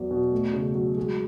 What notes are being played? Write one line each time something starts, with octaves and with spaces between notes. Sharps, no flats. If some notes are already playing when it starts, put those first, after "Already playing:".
Already playing: E2 F#3
B2
A3
C#3
F#3
G#3